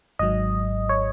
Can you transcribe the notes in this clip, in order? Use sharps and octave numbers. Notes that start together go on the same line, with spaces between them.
G#1 G#2 F#3 D#5
C#5